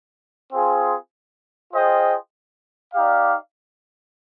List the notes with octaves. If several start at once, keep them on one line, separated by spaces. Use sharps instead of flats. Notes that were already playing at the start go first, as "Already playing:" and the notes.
C4 F4 G#4
F4 G#4 C5 D#5 G5
D#4 G4 D5 F5